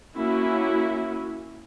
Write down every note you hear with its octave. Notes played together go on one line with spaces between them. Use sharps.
A#3 C#4 E4 F#4